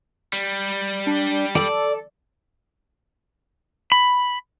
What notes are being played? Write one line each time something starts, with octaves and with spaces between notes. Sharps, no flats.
G3
D4
A4 D5
B5